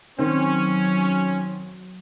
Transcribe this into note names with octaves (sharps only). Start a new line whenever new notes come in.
D#3 F#3 C4 C#4